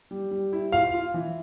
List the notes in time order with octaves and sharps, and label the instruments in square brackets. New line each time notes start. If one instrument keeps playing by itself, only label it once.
[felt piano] G3
G3
E4
[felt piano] F4 [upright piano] F5
[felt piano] F4
E3